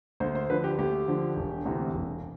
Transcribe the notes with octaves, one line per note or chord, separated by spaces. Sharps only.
D2 C5
C5
D3 F3 B4
G4
D2 G4
D3 F3
E1
D2 C3 E3
E1